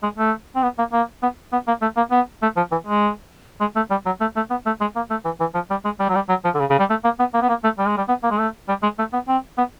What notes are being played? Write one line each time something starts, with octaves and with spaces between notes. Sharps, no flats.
G#3
A3
C4
B3
A#3
A#3
B3
B3
A#3
A3
A#3
B3
A3
F3
E3
G#3
G#3
A3
G3
F#3
A3
A3
B3
A3
G#3
A#3
A3
E3
E3
F3
G3
G#3
G3
F#3
G3
F#3
F3
D3
C#3
C#3
G3
A3
A#3
B3
A#3
B3
A#3
A3
G3
G#3
G3
B3
A#3
G#3
A3
G3
G#3
A3
B3
C4
B3